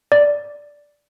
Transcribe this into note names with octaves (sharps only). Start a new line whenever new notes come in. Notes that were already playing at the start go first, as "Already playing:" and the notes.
D5